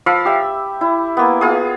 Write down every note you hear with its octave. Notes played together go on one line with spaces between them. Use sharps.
F3 F5 B5 E6
G4 E5
E4
A#3 B3
B3 F4 G#4